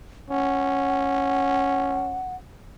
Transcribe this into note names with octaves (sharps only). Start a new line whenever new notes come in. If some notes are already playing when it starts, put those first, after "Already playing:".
C#4 F#5